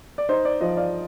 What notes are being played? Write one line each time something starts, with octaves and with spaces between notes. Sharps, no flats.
D5
D#4 C5 D#5
D5
F3 C5 D#5
D5 F5